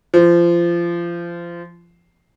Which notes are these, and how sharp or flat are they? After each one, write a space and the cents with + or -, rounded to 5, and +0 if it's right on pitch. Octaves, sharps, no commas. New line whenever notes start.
F3 -25